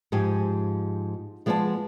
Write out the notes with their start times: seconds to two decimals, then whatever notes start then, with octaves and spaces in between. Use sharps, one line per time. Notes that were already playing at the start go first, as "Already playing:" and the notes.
0.12 G#2 F3 G4 G#5
1.46 F3 G#3 B3 D5 D#5 A5